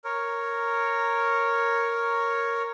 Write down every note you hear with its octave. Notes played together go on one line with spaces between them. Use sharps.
A#4 C#5